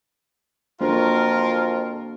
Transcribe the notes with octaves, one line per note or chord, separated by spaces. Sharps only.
F2 A#3 D4 F4 F#4 A#4